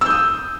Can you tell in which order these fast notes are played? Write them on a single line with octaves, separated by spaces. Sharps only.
E6 G6 D#6